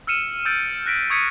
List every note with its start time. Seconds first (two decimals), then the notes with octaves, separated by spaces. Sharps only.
0.07 E6 F6 C#7 D#7 E7
0.45 E6 G6 A6 D7 E7
0.86 F#6 A#6 B6 D7
1.10 C#6 D#6 G#6 B6 C#7 D#7